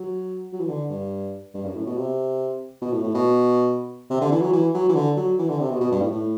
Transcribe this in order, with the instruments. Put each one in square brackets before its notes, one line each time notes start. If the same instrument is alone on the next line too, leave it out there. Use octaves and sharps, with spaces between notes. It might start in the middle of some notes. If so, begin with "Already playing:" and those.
Already playing: [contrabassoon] F#3
F#3
E3
D3
G2
G2
F#2
A2
B2
C3
B2
A2
A2
B2
C3
D3
E3
F#3
E3
F#3
E3
D3
F#3
E3
D3
C3
B2
B2
G2
A2
A2